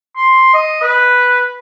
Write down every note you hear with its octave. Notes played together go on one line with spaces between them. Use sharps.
C6
D#5
B4